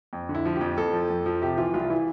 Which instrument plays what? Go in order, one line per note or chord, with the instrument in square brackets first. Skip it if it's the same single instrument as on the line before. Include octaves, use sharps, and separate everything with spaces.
[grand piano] F2
D3
E4
F3
G4
F2
F2 A4
F3
F2
F3
C3 G4
E3 F4
C2 F4
E3 E4